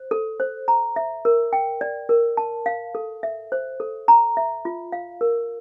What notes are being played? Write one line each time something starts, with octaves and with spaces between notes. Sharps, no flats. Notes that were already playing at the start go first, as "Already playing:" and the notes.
Already playing: C5
A4
C5
A#5
E5
A#4
G5
D5
A#4
A5
F5
A4
E5
C5
A4
A#5
E5
F4
F5
A#4